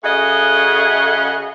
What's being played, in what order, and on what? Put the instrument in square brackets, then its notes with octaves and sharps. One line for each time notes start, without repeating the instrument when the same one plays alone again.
[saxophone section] C#3 A3 F#4 G#4 D#5